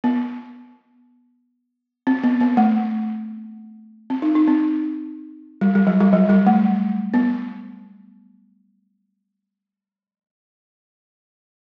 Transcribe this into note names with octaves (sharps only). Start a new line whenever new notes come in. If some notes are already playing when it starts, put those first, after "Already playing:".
B3
C4
B3
B3
A3
C4
D#4
D#4
C4
G3
G3
F#3
G3
F#3
G3
A3
B3